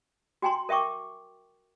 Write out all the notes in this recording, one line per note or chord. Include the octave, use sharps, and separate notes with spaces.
F#4 G5 G#5 A#5 C6
A#4 E5 G5 C#6 D6